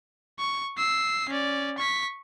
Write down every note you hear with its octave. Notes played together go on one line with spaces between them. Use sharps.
C#6
E6 C7
C#4 D5
C#6 B6